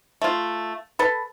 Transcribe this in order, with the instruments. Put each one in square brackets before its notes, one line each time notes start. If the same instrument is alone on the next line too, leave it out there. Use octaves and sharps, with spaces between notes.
[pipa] A3 F4
A4 B4